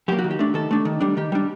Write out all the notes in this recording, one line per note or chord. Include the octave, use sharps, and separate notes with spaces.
F#3 A#3 G4
F#4
D#3
G4
A3 D4
D#3 A4
A3 D4
D#3
G3 D4
D#3 G4
G3 D4